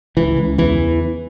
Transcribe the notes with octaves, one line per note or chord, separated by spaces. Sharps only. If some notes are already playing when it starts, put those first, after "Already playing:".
C#2 E3
C#2
E2 E3